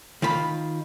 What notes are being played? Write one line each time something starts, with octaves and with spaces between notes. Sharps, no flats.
D#3 F4 B5